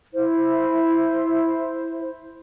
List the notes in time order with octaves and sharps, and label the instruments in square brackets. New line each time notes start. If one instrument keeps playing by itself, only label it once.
[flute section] E4 C5